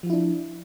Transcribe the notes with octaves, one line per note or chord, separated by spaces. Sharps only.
F3 D4 E4 F4